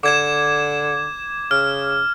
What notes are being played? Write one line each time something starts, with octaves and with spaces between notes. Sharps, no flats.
D3 D6 G#6 E7
C#3 F6